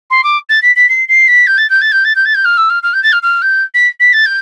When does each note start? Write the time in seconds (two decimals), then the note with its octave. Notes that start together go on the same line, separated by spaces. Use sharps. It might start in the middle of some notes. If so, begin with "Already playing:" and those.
0.10 C6
0.23 D6
0.49 A6
0.62 B6
0.76 B6
0.89 C7
1.08 C7
1.28 B6
1.47 G6
1.58 A6
1.70 G6
1.81 A6
1.92 G6
2.04 A6
2.15 G6
2.25 A6
2.35 G6
2.45 F6
2.57 E6
2.70 F6
2.83 F6
2.93 G6
3.03 A6
3.12 F6
3.23 F6
3.42 G6
3.74 B6
4.00 B6
4.13 A6
4.26 G6